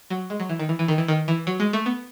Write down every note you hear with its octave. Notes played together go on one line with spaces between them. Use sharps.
F#3
G#3
F#3
E3
D#3
E3
E3
D#3
E3
D#3
E3
F#3
G#3
A3
B3